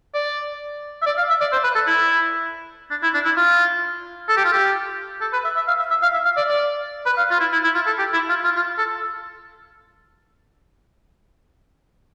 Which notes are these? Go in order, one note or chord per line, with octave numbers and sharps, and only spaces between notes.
D5
E5
D5
F5
E5
D5
C5
B4
A4
E4
D4
E4
D4
E4
F4
A4
G4
F4
G4
A4
B4
E5
E5
F5
E5
E5
F5
E5
F5
D5
D5
B4
F5
F4
E4
E4
E4
F4
A4
G4
E4
F4
F4
F4
A4